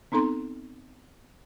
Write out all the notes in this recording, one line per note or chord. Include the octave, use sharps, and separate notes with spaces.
B3 C4 D#4 A4 A#5 C6